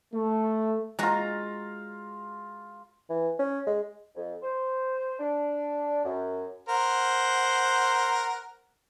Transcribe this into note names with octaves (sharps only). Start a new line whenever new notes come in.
A3
G#3 F4 F#4 A#5
E3
C#4
G#3
F2
C5
D4
F#2
A#4 C5 F#5